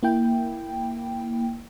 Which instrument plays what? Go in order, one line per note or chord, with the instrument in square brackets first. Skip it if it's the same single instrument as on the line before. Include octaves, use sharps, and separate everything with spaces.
[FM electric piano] A#3 E4 G5